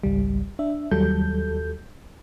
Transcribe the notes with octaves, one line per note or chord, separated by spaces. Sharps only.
G#1 C#2 G3
D4 E5
D#2 F#3 G3 A4 G6